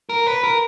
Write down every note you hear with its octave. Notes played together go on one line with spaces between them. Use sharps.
A#4
B4
A#4